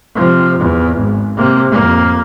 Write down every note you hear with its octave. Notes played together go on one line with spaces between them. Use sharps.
C3 F3
E2
G#1
C3 A#3
F2 A#3